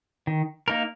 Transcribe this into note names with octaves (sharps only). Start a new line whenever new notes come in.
D#3
A#3 D#4 A#4